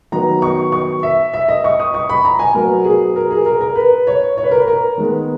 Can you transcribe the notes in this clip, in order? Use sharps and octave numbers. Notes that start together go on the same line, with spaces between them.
D#3 F#3 B3 A#5
C#6
C#6
E5
E5
D#5
C#6
D#6
C#6
B5
A#5
G#5
B2 F#3 B3 A#4
G#4
A#4
G#4
A#4
A#4
B4
C#5
C#5
B4
A#4
B4
A#4
D#3 G#3 B3